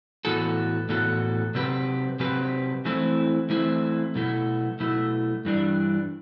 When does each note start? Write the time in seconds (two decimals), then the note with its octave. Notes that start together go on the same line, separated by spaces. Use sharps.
0.25 A2 E3 B3 F#4 A4
0.89 A2 E3 B3 F#4 A4
1.55 C3 F#3 C4 G4 B4
2.20 C3 F#3 C4 G4 B4
2.85 E3 A3 C4 E4
3.50 E3 A3 C4 E4
4.15 B2 F#3 A3 E4
4.80 B2 F#3 A3 E4
5.45 G2 E3 G3 D4